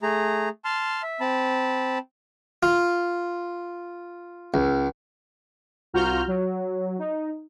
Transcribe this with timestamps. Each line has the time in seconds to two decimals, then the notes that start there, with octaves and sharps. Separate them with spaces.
0.03 A3 G#4 A#5
0.65 A5 C6 F6
1.03 E5
1.20 C4 A5 B5
2.63 F4
4.54 C#2
5.93 C2 F4 F#4 A#5 F6 G6
6.28 F#3
6.99 D#4